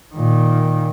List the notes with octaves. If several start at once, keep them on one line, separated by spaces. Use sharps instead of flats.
A#2 D#3